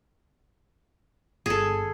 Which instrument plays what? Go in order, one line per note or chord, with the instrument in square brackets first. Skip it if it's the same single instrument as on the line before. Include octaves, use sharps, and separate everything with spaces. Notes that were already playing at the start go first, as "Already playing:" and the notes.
[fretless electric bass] G1 [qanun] G#4 A4